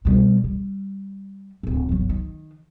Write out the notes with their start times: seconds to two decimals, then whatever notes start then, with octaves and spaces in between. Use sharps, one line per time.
0.05 B2 G3
0.44 G3
1.63 D1 G1
1.89 G1 F#3
2.09 D#3